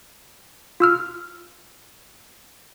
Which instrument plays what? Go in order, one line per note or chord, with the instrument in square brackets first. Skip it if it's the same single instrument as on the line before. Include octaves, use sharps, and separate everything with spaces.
[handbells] F4 E6 F6